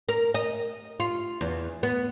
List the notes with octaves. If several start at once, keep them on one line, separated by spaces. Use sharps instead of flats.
A#4
D#5
F4
E2
B3